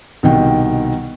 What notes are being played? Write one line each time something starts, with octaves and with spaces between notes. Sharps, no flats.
C2 B2 D#3 G5